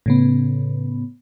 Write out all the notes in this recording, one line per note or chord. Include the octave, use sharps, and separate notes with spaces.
A2 C#3 B3